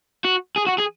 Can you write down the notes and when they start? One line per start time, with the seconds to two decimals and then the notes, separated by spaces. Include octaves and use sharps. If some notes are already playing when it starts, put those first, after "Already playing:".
0.25 F#4
0.58 G#4
0.68 F#4
0.80 G#4